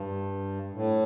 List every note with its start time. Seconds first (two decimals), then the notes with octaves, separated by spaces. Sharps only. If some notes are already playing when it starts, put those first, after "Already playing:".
Already playing: G2
0.73 A2